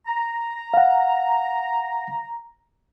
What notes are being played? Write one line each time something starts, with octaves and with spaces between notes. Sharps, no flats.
A#5
F5 F#5